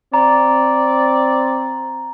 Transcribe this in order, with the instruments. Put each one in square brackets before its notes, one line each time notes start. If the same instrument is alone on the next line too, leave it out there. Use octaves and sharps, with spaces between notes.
[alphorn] C4 [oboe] D5 [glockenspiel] A#5